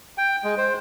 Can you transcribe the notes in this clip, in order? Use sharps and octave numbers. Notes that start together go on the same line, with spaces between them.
G5
G#3
C5